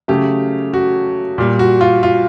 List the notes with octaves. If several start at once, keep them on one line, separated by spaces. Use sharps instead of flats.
C#3 F#3 A3 G4
F#4
A#2 G3
F#4
F4
F4